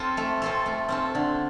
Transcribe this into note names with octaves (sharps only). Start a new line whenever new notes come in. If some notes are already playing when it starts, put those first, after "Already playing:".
Already playing: C4 F4 A4
A3
C4 F4 A4
A3
C4 F4 A4
D3